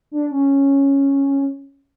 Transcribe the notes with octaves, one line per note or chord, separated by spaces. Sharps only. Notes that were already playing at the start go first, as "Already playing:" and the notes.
D4
C#4